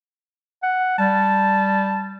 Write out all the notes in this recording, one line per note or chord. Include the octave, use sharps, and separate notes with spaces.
F#5
G3 A5